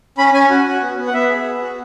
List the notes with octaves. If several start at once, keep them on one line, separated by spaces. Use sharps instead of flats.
C#4 B5
C#4 G#5
F#4
F#4
B3
B3
F#5
B3 E5
G#4
B3
F#4